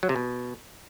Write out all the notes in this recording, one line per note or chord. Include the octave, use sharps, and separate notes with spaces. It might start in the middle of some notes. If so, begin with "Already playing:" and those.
F#3
C3
B2